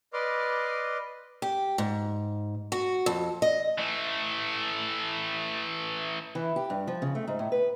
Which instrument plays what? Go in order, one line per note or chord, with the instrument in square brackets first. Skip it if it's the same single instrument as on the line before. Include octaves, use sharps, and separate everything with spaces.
[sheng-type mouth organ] B4 D5 D#5 C6 D6 F6
[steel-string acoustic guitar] G4
G#2
F#4
F2
D#5
[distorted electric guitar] E3 A3
[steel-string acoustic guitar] E3
G4
G2
F3
C#3
A3
G#2
A2
B4